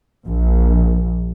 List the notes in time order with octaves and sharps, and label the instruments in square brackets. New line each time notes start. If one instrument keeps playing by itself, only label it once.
[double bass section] A#1